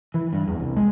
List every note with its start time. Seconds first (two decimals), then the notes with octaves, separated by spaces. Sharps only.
0.14 E3
0.33 G2
0.47 E2
0.59 C2
0.76 G#3